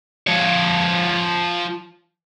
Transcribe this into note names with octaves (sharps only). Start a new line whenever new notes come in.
F3 C#5